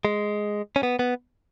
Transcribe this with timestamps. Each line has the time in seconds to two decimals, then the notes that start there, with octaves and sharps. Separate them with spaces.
0.05 G#3
0.76 C#4
0.83 B3
0.99 B3